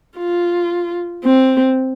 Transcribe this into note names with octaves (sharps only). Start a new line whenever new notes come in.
F4
C4